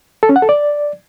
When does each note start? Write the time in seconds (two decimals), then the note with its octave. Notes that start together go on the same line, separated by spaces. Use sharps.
0.23 A4
0.29 C#4
0.36 F#5
0.42 A4
0.49 D5